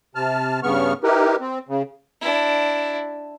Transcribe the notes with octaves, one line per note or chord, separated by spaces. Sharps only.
C3 A5 F6
G2 C#3 B3 C#6 F6
D#4 E4 G4 A#4 B4
C4
C#3
D4 E4